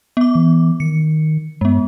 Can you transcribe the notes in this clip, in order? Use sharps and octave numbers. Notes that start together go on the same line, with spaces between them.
B3 D6
E3
D#3 C#7
G2 G#3 B3